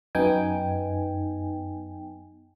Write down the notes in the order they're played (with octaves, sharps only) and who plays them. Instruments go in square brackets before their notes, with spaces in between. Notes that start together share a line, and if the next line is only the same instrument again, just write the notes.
[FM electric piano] F#2 B3 D#4 G5 G#5